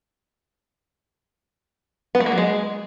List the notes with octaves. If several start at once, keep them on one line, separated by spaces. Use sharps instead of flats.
B3
A3
A#3
F#3
G#3